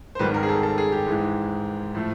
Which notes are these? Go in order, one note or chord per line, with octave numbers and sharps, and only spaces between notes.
C5
G#1 G#2 D#3 G3 B4
A#4
G#4
A4
A4
G#4
G4
G#2 E3 G#3
A2 F3 A3